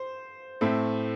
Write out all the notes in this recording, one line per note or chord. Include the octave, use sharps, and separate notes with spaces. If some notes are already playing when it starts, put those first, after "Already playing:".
Already playing: C5
A2 A3 C4